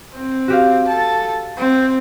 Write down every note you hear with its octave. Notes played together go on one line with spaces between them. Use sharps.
C4
F#4 G4 F5
A4 A5
C4